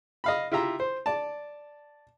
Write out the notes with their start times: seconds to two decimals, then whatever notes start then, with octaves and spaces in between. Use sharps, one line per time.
0.24 D#5 F5 B5
0.52 E4 F4 G4 E5 A#5
0.80 C5
1.06 D5 A5